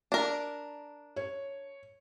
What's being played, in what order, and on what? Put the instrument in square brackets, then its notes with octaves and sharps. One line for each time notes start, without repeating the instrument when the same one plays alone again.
[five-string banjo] D4 A#4
[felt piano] C#5